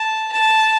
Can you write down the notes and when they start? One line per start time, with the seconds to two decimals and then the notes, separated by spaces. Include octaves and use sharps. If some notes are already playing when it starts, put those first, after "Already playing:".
Already playing: A5
0.32 A5